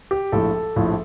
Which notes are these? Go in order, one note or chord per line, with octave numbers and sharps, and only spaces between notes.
G4
A#1 A2 F3 A4
A#1 A2 F3